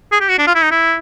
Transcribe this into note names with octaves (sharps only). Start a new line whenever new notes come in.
G#4
G4
F#4
D4
F4
E4
D#4
E4